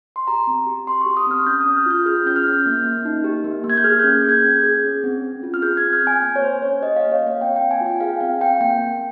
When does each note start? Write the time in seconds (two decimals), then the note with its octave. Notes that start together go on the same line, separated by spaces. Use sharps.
0.16 C6
0.27 G4 A#5
0.47 C4
0.67 G4
0.87 C4 C6
1.01 G4 C#6
1.17 D#6
1.27 C4 F6
1.46 C#4 G6
1.61 D#6
1.66 C#4
1.76 F6
1.86 F4 G6
2.06 G#4 F6
2.26 C#4 G6
2.36 F6
2.46 C#4
2.66 A#3
2.85 A#3
3.05 D#4
3.24 G4
3.44 A#3
3.64 A#3
3.70 G#6
3.77 G6
3.84 G#4 F6
3.99 C#4 G6
4.24 G#4
4.29 G#6
4.44 C#4
4.64 G#4
4.84 C#4
5.04 C4
5.24 C4
5.43 F4
5.54 F6
5.62 G#4 G6
5.77 G#6
5.83 C4
5.93 F6
6.03 C4 G#5
6.22 A#3
6.36 C#5
6.42 A#3 C5
6.62 C#4 C#5
6.82 G4 D#5
6.96 F5
7.02 A#3
7.12 C#5
7.22 A#3 F5
7.41 C4 G5
7.56 C4 G5
7.71 G#5
7.81 F4
7.86 G5
8.00 G#4 F5
8.21 C4 F5
8.40 C4 G5
8.60 A#3 G5
8.80 A#3